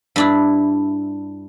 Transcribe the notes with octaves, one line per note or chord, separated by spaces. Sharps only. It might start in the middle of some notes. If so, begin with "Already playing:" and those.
G2 D4 E4